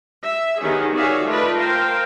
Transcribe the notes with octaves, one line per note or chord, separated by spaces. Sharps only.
E5
D#3 B3 C#4 G4 G#4
F#4 G#4 C#5 D5 E5 F5
A3 F4 B4 D5 D#5
A#4 C5 F5 G5